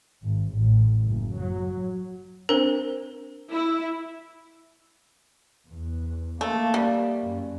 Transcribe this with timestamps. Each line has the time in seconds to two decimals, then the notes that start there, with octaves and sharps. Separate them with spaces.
0.24 G#1
0.54 A1
1.06 F#1
1.36 F#3
2.49 C4 D4 A#4 C5
3.49 E4
5.69 E2
6.41 A3 A#3
6.74 G3
7.22 F#2